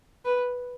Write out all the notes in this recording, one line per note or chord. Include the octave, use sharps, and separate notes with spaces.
B4